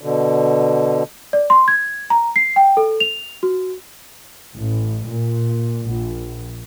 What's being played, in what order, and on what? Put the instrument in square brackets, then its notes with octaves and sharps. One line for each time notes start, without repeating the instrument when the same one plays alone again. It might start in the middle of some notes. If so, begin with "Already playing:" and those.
[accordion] B2 D3
[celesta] D5
C6
G#6
A#5
C7
G5
A4
F7
F#4
[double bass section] A1
A#2
A#1